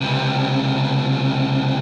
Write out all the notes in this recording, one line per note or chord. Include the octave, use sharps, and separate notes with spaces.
C#2 C3